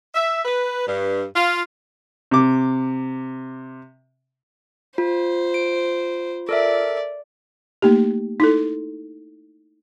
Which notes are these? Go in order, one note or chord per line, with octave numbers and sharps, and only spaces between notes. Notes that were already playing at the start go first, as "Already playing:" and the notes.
E5
B4
G2
F4
C3 D6
F4 C5
D7
A4 A#4 D5 E5
A3 A#3 D#4 G4
D#4 E4 A4